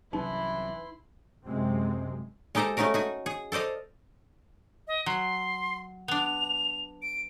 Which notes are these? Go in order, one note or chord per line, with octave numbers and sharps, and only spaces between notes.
C2 E3 F#3 C#4 D#4 E4 C6
F#2 C3 G#3 C4
G#3 D#4 G4 A4 C5 A#5
G#3 A3 C#4 D#4 F#4 A#4
D#4 F#4 G#5
G#4
A4 C5 D5 D#5 F5
D#5
F#3 C6
B3 D4 F7
D7